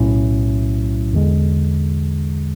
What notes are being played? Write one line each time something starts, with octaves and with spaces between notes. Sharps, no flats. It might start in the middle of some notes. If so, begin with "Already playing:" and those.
Already playing: B1 A2 F#3 C#4 E4
E2 D3 G#3